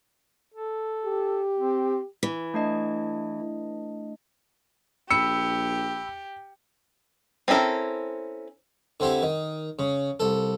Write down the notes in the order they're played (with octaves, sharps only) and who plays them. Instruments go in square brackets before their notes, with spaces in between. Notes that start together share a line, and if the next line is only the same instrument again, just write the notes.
[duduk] A4
[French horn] G4
[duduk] C4
[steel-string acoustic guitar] E3
[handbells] A3 D4 D#5
[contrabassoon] A#1 [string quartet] G4 [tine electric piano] B5 E6 [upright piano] C#7
[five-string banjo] C4 C#4 E4 A4 A#4
[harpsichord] D3 C4 E4 G4
D#3
C#3
C2 A4